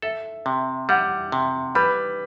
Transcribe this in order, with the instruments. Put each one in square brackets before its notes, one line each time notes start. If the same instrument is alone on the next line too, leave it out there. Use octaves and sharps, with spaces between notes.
[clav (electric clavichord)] A4 [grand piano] E5
[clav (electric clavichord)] C3
[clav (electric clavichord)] G3 [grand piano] F#5
[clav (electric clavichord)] C3
[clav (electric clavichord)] G3 [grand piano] B4 B5